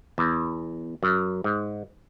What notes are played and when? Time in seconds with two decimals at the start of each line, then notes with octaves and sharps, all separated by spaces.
0.18 E2
1.03 F#2
1.44 G#2